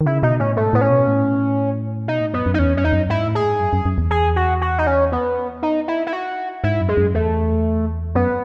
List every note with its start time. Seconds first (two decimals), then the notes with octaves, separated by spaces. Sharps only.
0.01 D#3
0.06 C#3 E4
0.23 B2 D#4
0.40 A2 C#4
0.57 G#2 A3
0.73 A2 B3
0.81 C#4
0.90 B2
1.07 A2
2.08 B2 D#4
2.21 A2
2.34 F#2 B3
2.46 F#2
2.54 D#4
2.59 E2 C#4
2.76 F#2 C#4
2.84 E2 D#4
2.93 F#2
3.09 G#2 E4
3.27 A2
3.35 G#4
3.43 G#2
3.60 F#2
3.73 F#2
3.86 F#2
3.98 E2
4.11 G#4
4.36 F#4
4.61 F#4
4.79 D#4
4.87 C#4
5.12 B3
5.63 D#4
5.88 E4
6.07 E4
6.13 F#4
6.63 G#2 E4
6.81 F#2
6.88 G#3
6.97 F#2
7.14 E2 A3
8.15 F#2 B3